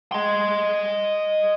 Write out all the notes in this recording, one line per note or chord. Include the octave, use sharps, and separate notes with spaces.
D#5 C6